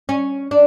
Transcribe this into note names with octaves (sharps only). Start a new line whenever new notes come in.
C#4
D4